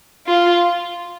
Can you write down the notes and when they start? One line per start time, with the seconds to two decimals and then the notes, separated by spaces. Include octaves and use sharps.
0.27 F4